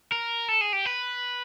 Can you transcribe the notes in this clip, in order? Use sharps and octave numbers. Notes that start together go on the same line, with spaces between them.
A#4
A4
G#4
G4
B4